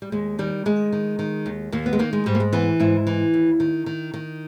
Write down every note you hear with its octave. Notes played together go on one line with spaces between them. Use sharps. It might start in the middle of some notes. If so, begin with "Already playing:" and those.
G3
D#2 G#3
D#3 G3
D#3 G#3
D#3
D#3
D#2
D#2 A#3
B3
G#3
D#3 A#3
G#3
G#2 G3
A#3
G#3
E3 B3
G#2 E4
E3
D#2
D#3
D#3
D#3